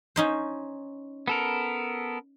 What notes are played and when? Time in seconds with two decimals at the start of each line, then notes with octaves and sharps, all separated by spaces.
0.16 C#4 D#4 C5
1.28 B3 A4 A#4